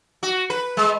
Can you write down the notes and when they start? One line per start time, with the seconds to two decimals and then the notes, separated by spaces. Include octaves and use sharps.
0.23 F#4
0.50 B4
0.77 G#3